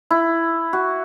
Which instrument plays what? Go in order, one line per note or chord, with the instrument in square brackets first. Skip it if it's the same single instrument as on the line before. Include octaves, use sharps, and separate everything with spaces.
[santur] E4
F#4